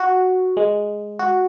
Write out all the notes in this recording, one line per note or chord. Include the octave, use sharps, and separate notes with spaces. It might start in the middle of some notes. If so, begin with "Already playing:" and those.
Already playing: F#4
G#3
F#4